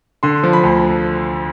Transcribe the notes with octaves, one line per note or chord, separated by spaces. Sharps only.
D3 C6
F3
B5
D2